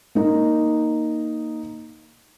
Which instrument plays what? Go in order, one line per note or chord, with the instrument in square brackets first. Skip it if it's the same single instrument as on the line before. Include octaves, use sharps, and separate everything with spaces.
[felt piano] A#3 D#4